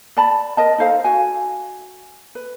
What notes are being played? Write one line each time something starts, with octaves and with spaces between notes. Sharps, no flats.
D5 A5 B5
A#4 D#5 A5
D#4 A4 C5 F5
F#4 G#5
B4